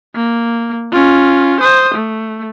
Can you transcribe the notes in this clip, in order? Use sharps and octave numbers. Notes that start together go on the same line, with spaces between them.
A#3
C#4 F4
C5 D#6
A3